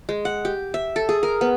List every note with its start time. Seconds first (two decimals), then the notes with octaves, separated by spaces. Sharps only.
0.09 G#3
0.25 F#5
0.45 G4
0.74 E5
0.96 A4
1.09 G#4
1.23 A#4
1.41 B3